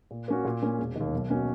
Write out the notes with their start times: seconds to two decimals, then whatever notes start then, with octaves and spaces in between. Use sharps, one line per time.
0.11 A#2
0.28 A#3 C#4 F#4
0.45 A#2
0.63 A#3 C#4
0.79 E1
0.95 D#2 D#3
1.13 B1
1.30 B2 A#3 C#4 F#4